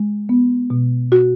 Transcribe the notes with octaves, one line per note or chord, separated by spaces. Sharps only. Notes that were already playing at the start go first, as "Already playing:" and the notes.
Already playing: G#3
B3
B2
F#4